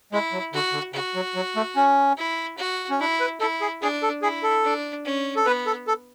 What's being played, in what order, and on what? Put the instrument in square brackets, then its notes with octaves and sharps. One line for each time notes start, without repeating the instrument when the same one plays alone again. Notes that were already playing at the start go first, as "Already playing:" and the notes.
[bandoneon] G#3 [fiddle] E4
[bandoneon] F#3
[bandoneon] D3 [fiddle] F#4
[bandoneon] D3
[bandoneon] C#3 [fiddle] F#4
[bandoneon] F#3
F#3
A3
C#4
[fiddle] E4
F#4
[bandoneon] C#4
[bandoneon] D4 [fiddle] E4
[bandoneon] B4
[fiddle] E4 [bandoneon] A4
[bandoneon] G#4
[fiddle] D4 [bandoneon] G#4
[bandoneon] A4
[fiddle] E4 [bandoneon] G#4
[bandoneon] A4
[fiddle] D4
C#4
[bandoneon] A4
[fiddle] B3 [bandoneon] B4
[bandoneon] A4
A4